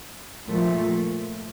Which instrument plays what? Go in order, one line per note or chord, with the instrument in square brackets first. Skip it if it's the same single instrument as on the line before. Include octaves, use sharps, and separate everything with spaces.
[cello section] A#2 F3 A3